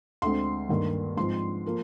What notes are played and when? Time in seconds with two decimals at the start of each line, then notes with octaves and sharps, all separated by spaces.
0.22 D2 D3 G#3 C4 C6
0.69 G2 D#3 A#3
1.17 G#2 F3 C4 C6
1.66 F3 A#3